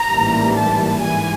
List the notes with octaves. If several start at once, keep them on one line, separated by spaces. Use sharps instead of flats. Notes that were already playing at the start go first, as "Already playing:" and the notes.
Already playing: A#5
A1 G#2 E3 G3 A#3
A5
G#2 E3 G#5